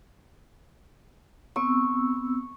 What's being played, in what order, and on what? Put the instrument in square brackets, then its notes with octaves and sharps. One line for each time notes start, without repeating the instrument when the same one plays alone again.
[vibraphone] B3 C4 E6 [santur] C#6